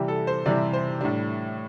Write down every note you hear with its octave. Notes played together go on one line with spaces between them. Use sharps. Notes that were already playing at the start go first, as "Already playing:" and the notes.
Already playing: C3 E3 G3 G4
A4
C5
C3 E3 G3 D5
C5
A2 G3 D4